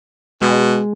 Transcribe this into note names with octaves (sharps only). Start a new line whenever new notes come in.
B2 G#3